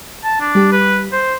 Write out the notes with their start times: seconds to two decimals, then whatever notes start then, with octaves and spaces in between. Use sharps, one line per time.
0.24 A5
0.40 D4
0.55 G3 G4
0.72 B4
1.12 C5